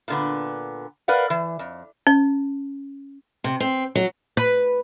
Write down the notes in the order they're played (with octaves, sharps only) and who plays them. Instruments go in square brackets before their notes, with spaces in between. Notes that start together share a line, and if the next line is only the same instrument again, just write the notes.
[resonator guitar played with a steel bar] A#2 D3 B3
A#4 B4 D5 F5 F#5
E3
F2
[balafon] C#4
[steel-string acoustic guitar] C3
C4
F#3
[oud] B4